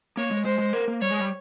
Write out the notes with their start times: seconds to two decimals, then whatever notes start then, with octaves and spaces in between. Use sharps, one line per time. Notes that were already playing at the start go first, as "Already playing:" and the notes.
0.17 A#3 C#5
0.31 G#3
0.45 G#3 C5
0.59 G#3
0.73 A#3
0.88 A#3
1.01 G3 C#5
1.11 G#3
1.20 G3